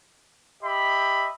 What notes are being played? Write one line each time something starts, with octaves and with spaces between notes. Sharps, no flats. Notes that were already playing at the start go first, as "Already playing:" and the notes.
G4 D#5 E5 B5